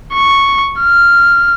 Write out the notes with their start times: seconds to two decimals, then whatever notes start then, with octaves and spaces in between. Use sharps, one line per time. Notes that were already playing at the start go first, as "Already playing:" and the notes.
0.14 C#6
0.80 F6